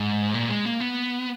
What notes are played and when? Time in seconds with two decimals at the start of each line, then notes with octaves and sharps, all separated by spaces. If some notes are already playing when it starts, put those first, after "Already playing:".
Already playing: G#2
0.34 A#2
0.49 G#3
0.65 A#3
0.80 B3